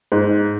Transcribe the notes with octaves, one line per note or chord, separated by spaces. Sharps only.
G#2